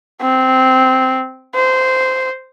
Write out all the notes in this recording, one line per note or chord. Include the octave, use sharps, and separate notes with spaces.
C4
C5